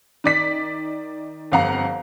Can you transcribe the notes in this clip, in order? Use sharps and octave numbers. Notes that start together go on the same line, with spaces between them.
D#3 D5 B6
G1 F2 F5 F#5 A#5